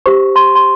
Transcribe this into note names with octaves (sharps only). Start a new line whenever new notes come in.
G4 C5 C#6
C6
C6